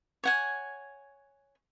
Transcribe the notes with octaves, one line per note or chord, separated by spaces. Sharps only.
C#5 F#5 G#5